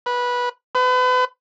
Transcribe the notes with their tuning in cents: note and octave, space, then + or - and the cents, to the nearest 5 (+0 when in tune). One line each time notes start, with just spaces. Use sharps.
B4 -15
B4 +35